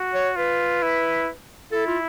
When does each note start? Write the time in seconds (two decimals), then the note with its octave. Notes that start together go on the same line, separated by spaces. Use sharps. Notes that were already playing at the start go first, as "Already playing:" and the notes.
Already playing: F#4
0.14 C#5
0.36 F4 B4
0.82 E4
1.72 E4 A4
1.87 F4